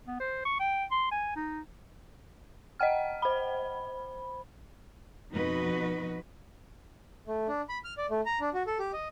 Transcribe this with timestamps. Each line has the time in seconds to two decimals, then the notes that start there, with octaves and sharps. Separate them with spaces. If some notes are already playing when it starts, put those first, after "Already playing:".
0.07 B3
0.20 C5
0.45 C#6
0.60 G5
0.91 C6
1.11 G#5
1.36 D#4
2.80 D#5 F#5 G5 F6
3.22 C5 B5
5.33 F2 B2 D#4 F#4 B4 D#5
7.28 A3
7.48 D4
7.69 B5
7.84 F6
7.98 D5
8.10 A3
8.26 A#5
8.40 D4
8.54 F#4
8.67 A4
8.79 G4
8.93 D#5